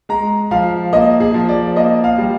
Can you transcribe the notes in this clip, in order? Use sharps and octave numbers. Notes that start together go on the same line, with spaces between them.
G#3 A#5
F3 F5
A#3 D#5
G#4
F3
D5
A#3 D#5
F5
G3